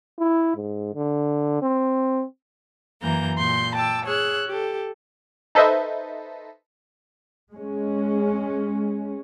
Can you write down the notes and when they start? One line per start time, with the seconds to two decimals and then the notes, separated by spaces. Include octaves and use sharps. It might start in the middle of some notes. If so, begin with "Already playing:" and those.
0.19 E4
0.56 G#2
0.94 D3
1.62 C4
3.01 F#2 E3 A#3 A#5 G6
3.39 A#2 C6 G6
3.74 G5 A5 D6 E6
4.05 G#4 C#5 E6 F#6
4.48 G4 A4
5.55 D#4 A4 B4 C5 D#5 E5
7.52 G#3 C#4